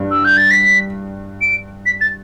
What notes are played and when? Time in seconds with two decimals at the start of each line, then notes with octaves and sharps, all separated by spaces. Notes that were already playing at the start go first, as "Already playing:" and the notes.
Already playing: G2
0.11 E6
0.25 G6
0.37 A6
0.51 B6
1.41 D7
1.86 B6
2.01 A6